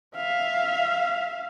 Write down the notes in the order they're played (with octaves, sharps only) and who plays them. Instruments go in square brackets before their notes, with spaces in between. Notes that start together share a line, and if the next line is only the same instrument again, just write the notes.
[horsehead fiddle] E5 F5